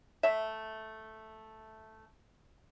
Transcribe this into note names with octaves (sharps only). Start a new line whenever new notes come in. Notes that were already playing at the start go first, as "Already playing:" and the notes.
A3 E5